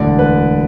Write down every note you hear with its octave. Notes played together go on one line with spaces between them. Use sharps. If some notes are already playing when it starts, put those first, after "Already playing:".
Already playing: E1 D2 D3 D5
B4